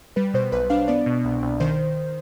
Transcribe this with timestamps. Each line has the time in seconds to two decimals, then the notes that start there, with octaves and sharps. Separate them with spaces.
0.16 G3 B4
0.34 B2 C5
0.52 B1 B4
0.70 D4 F5
0.88 B3 D5
1.06 B2
1.25 C2
1.42 C2
1.60 D#3 C5